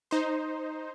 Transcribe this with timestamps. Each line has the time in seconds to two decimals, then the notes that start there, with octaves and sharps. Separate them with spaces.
0.11 D#4 C5